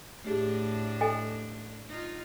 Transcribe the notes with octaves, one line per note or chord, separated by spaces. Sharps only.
A2 A3 D4 G4 G#4
A4 D#5 G#5
D#4 F4